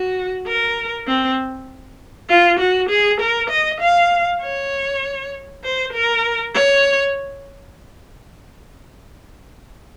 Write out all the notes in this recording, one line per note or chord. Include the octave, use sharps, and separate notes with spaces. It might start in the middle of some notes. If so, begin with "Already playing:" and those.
Already playing: F#4
A#4
C4
F4
F#4
G#4
A#4
D#5
F5
C#5
C5
A#4
C#5